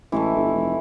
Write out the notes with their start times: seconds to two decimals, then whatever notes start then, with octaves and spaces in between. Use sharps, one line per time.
0.12 A1 E3 G#3 A3
0.36 G1
0.55 F1